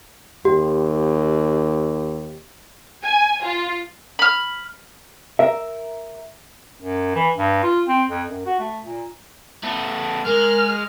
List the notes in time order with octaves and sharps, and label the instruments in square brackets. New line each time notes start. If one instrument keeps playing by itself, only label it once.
[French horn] D#2 [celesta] G4
[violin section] G#5
F4
[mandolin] B5 F6
[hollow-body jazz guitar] A#4 E5
[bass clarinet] F#2
E3
G2
F4
C4
F2
F#2
F#4
A3
A#2
[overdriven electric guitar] A3 B3
[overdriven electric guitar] G#3 [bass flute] A#4 [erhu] F6